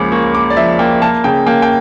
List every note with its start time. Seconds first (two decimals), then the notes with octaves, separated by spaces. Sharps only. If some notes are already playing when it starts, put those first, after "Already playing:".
Already playing: C#2 C#3 F3 A#3 D6
0.12 A#3 C#6
0.35 A#3 D6
0.50 D5
0.56 F3 E5
0.79 A#3 G5
1.02 A#3 A5
1.24 C#3 G5
1.47 A#3 G5
1.62 G5